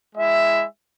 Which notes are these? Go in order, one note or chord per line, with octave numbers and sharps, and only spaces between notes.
G#3 E4 E5